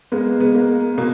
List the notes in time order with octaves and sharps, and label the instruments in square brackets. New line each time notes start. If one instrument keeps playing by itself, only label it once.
[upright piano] G#3 B3 [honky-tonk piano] A#3
[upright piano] G#3 B3
[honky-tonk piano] A#3
[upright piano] B2 [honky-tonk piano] A#3